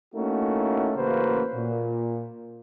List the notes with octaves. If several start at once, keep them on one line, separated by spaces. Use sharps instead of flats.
A3 A#3 C#4 D#4 E4 F#4
A1 C#3 A#3 F#4 B4 C5
A#2